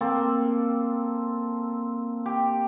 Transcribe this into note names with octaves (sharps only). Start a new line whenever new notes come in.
A#3 C4 A4
G4